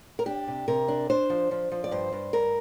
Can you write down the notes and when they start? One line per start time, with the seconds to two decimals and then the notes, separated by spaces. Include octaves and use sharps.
0.19 A#4
0.26 D4 G4
0.48 C3
0.68 C3 A#4
0.88 D4
1.10 D4 C5
1.30 F3
1.51 F3
1.71 F3
1.84 D5
1.91 G2 C5
2.12 G2
2.33 G2 A#4